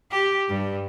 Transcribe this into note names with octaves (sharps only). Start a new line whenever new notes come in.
G4
G2